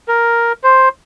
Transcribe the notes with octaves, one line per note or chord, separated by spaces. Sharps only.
A#4
C5